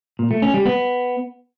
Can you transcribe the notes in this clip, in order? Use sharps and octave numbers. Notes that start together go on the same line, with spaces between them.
A#2
A3
C#4
G3
B3